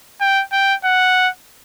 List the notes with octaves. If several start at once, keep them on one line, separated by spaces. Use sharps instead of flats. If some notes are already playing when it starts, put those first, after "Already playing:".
G5
G5
F#5